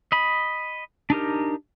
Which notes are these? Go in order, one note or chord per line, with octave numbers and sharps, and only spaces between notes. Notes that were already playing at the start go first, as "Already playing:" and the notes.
D#5 B5
D4 D#4 G4 A#4